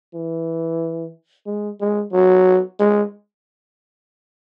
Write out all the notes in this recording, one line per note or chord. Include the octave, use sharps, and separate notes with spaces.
E3
G#3
G#3
F#3
G#3